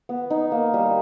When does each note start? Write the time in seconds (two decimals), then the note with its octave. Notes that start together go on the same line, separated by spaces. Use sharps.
0.09 B3
0.30 D#4
0.52 A#3
0.74 G3